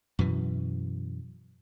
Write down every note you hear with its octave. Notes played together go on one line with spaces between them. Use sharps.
F#2 B2 E3